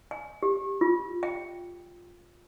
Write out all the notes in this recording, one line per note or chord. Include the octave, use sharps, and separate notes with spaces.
G#5
G4
F4
G5